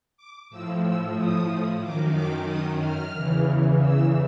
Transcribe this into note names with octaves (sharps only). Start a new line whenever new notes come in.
D6
A2 F3 E6
E6
D#6
F#2 D#3 D6
D6
D#6
F6
E2 C#3 E3
E6